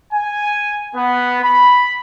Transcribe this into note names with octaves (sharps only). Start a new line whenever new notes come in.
G#5
B3
B5